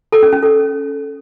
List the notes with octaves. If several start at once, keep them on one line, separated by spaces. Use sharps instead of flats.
A4
C#4
C#4
A4